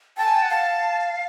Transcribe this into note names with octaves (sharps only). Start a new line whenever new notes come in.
G5 A5
G#5
G5
F#5
F5 A5